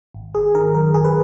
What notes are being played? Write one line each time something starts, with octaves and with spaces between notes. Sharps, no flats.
G#1
G#1 G#4
D#3 A#4
F#2 A#4
G#1 G#4
B4